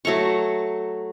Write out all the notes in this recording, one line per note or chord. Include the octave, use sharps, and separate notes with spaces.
F#3 A3 A#5 C#6